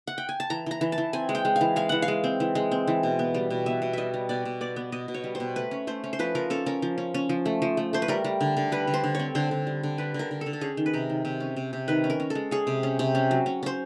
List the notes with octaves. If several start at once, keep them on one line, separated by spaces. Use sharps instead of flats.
F#5
G5
G#5
A5
E3 A#5
E3 A#5
E3
A5
E3
C4 G#5
G#3
G5
G#3
F5
E3
G#3 F5
E3 F#5
F5
G#3
C4
E3
G#3
C4
E3
B2
B3
G3
B2
B3 E5
B2
G3 D#5 E5
G3
B2 D5
B2
B3 D5
B3
B2 D#5
B2
C#5
G3
C5
B2
A3 B4
C#4
A3 C5
C#4
C5
F3 B4
F3 A#4
C#4 A4
C#4 A#4
F3
C#4
C#4
F3
A3
F3
A3
A3 C5
B4
G3 A#4
G3
D3
D3
G3 B4
D3
C5
D3
C4 C#5
D3 C5
D3
G3
D3
G3 B4
D3 A#4
D3
D3 A4
A4
C#4 G#4
D#3
B4
C3 A#4
D#3
C3
C#4
C3
C3
D#3 B4
C#4
A#4
C#4
A4
G#3
C#4 G#4
C3
C#4
C3
C#4
F#3
C#4
C#4 C5